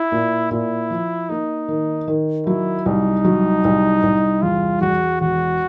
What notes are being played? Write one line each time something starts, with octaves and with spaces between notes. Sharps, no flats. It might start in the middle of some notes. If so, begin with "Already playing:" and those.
Already playing: E4
A#2
A#2 E4
F3
A#3 D#4
D#3
D#3
F#3 E4
C2 D#4
F#3
C2
C2
E2 F4
E2 F#4
E1 F#4